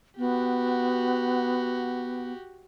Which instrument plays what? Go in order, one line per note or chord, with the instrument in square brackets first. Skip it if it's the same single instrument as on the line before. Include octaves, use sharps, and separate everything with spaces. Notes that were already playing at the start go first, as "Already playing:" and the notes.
[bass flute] B3 [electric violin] F#4 G4